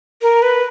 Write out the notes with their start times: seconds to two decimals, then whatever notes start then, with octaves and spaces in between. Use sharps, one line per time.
0.22 A#4
0.42 B4